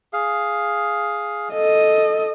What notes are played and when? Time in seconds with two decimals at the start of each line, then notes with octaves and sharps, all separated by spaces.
0.13 G#4 F5
1.54 A4 D#5